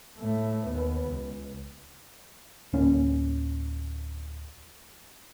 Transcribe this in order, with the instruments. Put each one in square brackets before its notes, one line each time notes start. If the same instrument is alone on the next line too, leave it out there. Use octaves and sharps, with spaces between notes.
[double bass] A2 A3
D#2 B3
C#2
[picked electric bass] D1 A#3 C#4